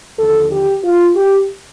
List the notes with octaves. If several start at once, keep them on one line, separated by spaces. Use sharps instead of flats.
D#2 D3 F3 A4
G4
F4
G4